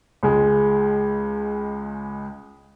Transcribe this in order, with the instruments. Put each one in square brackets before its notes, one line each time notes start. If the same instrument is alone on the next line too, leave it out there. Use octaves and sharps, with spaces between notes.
[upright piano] C#2 G#3